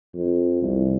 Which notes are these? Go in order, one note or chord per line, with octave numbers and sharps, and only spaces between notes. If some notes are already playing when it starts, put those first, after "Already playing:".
F2
C2